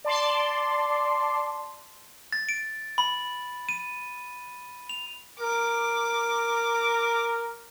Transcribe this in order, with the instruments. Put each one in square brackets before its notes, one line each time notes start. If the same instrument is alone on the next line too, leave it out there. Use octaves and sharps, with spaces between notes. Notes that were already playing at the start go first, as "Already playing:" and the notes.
[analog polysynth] D5 A5 C6
[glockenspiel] A6
D7
B5
D#7
F7
[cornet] A#4 [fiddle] D6